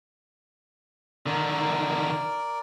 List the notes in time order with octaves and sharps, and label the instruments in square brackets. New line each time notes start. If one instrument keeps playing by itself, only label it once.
[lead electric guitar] D3 D#3 [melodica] A#4 D5